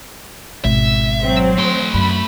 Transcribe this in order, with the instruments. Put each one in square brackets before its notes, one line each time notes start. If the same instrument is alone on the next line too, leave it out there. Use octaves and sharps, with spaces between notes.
[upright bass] G#1 B2 [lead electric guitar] E5
[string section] F#3 C4
[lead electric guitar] A3 C6
[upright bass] F#2 [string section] B5